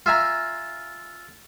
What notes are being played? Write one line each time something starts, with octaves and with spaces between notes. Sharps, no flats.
F4 E5 G#5 A#5